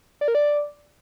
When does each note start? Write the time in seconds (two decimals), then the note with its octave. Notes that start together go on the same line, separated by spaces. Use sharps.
0.21 D5
0.28 A#4
0.35 D5